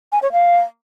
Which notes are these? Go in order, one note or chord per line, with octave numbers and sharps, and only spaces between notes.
G#5
C#5
F5